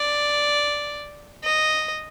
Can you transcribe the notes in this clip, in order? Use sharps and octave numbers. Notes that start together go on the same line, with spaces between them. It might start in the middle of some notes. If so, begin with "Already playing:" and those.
Already playing: D5
D#5